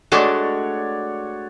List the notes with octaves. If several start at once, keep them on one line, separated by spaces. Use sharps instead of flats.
G#3 A3 D4 F#4 C#5 D5